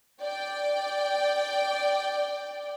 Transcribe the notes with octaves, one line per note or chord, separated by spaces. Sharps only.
D5 G5